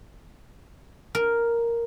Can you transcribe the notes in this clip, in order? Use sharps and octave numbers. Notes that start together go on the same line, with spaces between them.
A#4